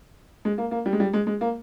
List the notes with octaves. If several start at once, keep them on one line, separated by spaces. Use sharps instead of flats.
G#3
A#3
A#3
G3
G#3
G3
G#3
G#3
A#3